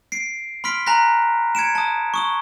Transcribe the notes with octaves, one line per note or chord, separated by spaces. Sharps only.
C7 D7
B5 C6 F6 B6 D7
G#5 A#5 B5 F#6 A#6 B6
G#6 C#7 D7 E7
A5 D#6
C#6 D#6 G7